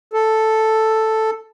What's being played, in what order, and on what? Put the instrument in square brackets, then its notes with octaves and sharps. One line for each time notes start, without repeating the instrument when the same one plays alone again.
[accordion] A4